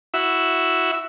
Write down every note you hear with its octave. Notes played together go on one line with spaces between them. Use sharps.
E4 F#4 E5